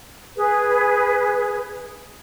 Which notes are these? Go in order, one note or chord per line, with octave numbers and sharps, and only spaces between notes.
G#4 B4